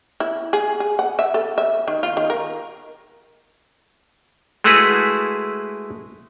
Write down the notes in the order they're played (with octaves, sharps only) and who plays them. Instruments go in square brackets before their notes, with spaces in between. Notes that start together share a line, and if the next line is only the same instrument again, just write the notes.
[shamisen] E4
G#4
G#4
F#5
E5
A4
E5
D#3
F4
D#3
A#4
[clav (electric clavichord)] G#3 A3 E4 F#4 G#4 B4